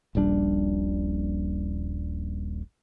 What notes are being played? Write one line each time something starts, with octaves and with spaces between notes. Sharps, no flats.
D#1 A#1 G3 D4